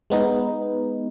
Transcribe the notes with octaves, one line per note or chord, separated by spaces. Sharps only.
G#3 B3 D#4